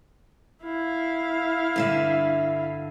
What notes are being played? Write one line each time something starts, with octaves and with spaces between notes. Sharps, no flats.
E4 F5
G2 D3 E5